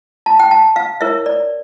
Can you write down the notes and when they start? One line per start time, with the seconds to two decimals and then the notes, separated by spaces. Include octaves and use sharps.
0.26 A5
0.40 G5
0.51 A5
0.76 F5
1.01 E4 A#4 C#5 E5
1.26 D5